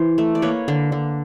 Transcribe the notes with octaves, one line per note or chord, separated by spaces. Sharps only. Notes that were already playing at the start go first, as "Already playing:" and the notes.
Already playing: E3 C5
A3
D5
A#3 B4 C#5
D3
D3